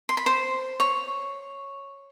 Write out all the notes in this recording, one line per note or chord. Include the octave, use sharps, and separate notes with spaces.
C6
B5
C5 C6
C#5 C#6